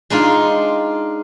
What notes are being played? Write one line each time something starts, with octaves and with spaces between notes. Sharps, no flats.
G#3 D4 D#4 F4